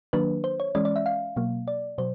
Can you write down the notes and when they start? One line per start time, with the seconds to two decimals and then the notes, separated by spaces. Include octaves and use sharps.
0.13 D#3 F#3 A#3 D4 B4
0.44 C5
0.60 C#5
0.75 E3 G#3 C#4 D5
0.85 D5
0.96 E5
1.06 F5
1.36 B2 F#3 A#3
1.68 D5
1.98 B2 F#3 C5